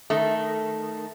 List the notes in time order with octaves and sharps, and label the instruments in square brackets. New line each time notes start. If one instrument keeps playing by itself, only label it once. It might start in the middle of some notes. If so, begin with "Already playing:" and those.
[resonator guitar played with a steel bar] D#3 A3